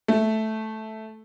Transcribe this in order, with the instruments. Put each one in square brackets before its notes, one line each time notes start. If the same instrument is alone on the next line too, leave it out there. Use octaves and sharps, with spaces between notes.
[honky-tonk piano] A3